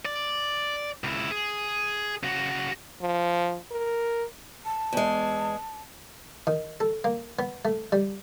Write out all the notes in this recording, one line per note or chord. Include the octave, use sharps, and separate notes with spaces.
D5
C#2 E4
G#4
C#3 F#4
F3
A#4
A5
E2 G#3
D#3
A4
A#3
B3
A3
G3